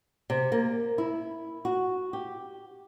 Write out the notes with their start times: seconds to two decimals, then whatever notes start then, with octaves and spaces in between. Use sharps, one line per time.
0.30 C3
0.52 A#3
0.98 E4
1.65 F#4
2.13 G4